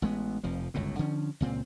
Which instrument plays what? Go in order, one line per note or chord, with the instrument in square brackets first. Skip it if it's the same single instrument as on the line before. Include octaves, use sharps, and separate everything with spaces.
[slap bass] A1 G#3 B3
F1 F2 F3
G1 C#2 F#2 A2
D3 F3 C#4
C#2 A#2 C4